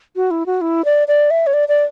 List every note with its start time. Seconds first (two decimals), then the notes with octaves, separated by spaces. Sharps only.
0.16 F#4
0.31 E4
0.46 F#4
0.61 E4
0.85 D5
1.08 D5
1.31 E5
1.47 C#5
1.54 D5
1.68 D5